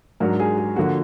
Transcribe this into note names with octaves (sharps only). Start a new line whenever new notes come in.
G#2 F#3 D4 F#4 A#4
G#4
G#4
D3 F3 A#3 F#4